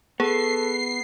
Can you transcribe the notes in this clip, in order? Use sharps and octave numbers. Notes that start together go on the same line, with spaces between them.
B3 G#4 A4 C7